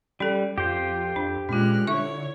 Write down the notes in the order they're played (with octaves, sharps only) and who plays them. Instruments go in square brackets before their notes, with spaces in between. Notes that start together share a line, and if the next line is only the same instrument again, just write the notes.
[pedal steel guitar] G3 [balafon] C#4 A4
[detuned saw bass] F2 [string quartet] F4 [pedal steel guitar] G4 C5
[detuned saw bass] F2 [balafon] D4
[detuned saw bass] A#2 [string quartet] G#3 F6 F#6 [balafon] C#4 F4
[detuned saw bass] D3 [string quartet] E4 C#5 [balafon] E5 C#6